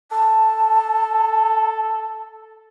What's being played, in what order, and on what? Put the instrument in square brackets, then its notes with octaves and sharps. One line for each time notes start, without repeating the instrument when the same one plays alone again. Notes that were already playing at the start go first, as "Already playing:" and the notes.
[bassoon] A4 [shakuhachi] A5